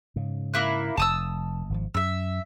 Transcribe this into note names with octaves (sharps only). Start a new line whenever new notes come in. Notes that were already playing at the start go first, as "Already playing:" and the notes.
G#2 C#3
A#3 E4 F#6
F1 A5 D#6 E6
G#1 D#3 F3
F#2 E5 E6